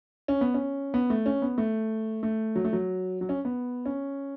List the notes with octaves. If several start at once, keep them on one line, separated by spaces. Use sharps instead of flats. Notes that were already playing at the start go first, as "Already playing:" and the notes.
C#4
B3
C#4
B3
A3
C#4
B3
A3
A3
F#3
A3
F#3
F#3
C#4
B3
C#4